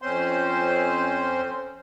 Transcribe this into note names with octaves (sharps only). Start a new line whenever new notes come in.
F2 C4 C#4 C5 C6